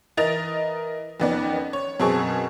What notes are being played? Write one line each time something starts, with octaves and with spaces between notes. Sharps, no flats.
E3 A#4 D#5 A6 D7 F7
F2 D#3 B3 C#4 D5
C#5
F#2 B2 C4 G#4 A5 C#6